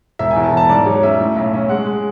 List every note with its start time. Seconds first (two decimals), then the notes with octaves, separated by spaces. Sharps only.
0.19 E1 E5
0.31 G#5
0.36 E2
0.43 A5
0.52 E1
0.57 A5
0.69 G#2 D5
0.86 F#3 C#5
1.03 C#4 E5
1.20 A2
1.36 B1
1.53 C#4
1.69 G#3 F#5
1.86 G#3